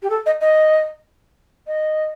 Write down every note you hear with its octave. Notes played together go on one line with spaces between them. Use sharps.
G4
A4
D#5
D#5
D#5